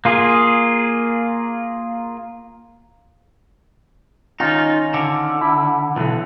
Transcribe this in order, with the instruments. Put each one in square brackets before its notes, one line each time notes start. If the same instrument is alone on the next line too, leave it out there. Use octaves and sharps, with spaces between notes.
[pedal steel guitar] A#3 F4 G#4
[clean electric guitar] D#3 C#4 F4 [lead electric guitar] D#4
[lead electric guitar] D3
[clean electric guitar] E4
[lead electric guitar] B1 [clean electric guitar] D3 E3